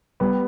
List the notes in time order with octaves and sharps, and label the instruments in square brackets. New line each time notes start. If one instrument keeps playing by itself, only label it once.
[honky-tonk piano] G3 [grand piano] B3